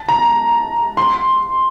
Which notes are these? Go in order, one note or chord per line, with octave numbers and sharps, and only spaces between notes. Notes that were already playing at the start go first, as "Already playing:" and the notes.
Already playing: A5
A#5
C6